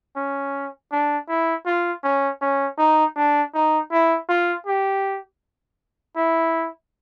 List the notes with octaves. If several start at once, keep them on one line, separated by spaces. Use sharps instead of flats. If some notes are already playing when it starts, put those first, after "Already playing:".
C#4
D4
E4
F4
C#4
C#4
D#4
D4
D#4
E4
F4
G4
E4